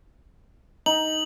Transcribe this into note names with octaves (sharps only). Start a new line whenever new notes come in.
D#4 F#7